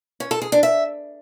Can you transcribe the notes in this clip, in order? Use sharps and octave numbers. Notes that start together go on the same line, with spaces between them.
C#4
A4
G#4
D4
E5